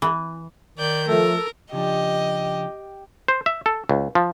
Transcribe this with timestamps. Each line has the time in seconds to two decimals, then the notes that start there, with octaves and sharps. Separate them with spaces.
0.02 E3
0.78 D#3 D5 G6
1.07 F3 A3 A4 A#4
1.73 C#3 F3 D4 G4 D#5
3.28 C5
3.46 E5
3.66 A4
3.89 C#2
4.15 F3